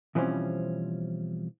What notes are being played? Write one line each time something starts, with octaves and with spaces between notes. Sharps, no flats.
B2 E3 F3 G3 C4 C#4